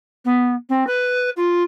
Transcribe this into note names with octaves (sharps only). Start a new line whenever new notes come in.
B3
C4
B4
F4